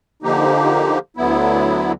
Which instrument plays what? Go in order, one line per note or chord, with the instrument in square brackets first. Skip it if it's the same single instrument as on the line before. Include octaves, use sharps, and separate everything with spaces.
[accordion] D3 F3 A#3 D#4 G4
D2 D3 F#3 B3 E4